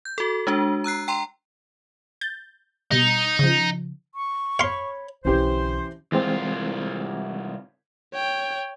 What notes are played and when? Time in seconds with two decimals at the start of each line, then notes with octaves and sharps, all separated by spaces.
0.05 G6
0.18 F#4 A4
0.47 G#3 D4 F#4
0.84 A#5 E6 F#6 C7
1.08 G5 A#5 C6
2.21 G6 A6
2.91 B2 G3 D#4
3.39 C#3 F3
4.15 C#6
4.59 C#5 F5 B5 C6
5.25 B1 D3 E3 C#4 G4 C5
6.12 C2 E3 G#3 C4 F4
8.14 C#5 G5